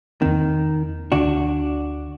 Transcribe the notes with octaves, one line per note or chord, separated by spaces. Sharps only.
E2 D#3 A#3 C4
D2 D3 D4 F#4